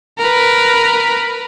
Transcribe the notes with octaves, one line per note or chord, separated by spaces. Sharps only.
A#4 B4